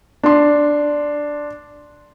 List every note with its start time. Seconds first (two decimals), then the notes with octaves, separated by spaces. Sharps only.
0.23 D4 C6